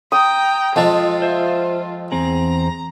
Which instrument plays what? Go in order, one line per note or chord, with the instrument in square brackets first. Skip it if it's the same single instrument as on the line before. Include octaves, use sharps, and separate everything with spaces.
[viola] G5 A#5 [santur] D#6
[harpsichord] F2 F3 G#3 [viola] F4 [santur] A5
[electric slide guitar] C5 E5
[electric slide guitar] E2 C4 G#4 [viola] A#5